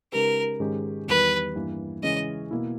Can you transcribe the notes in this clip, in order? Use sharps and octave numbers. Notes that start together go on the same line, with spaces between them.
C#3 G#3 D#4 G4 A#4 B4
G#2 D#3 G#3 C#4 G4
E2 D#3 G3 B4
G2 E3 A#3
C#3 E3 G#3 C#4 D#5
B2 A#3 E4